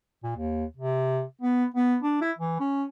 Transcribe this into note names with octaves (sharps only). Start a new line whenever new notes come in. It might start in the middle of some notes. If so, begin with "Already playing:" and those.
A#2
D#2
C3
B3
B3
D4
E4
E3
C#4